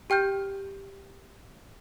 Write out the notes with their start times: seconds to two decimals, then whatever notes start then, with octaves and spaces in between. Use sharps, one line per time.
0.10 G4 G5 F6 G6